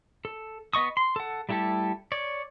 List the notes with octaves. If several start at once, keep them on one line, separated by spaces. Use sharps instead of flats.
A4
B3 D#5 C#6 D#6
C6
A4 F#5
G3 A3 E4 G4 A4
C#5 D5